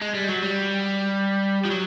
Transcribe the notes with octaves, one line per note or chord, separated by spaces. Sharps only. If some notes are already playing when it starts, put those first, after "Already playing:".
G#3
G3
F#3
G3
F3
F#3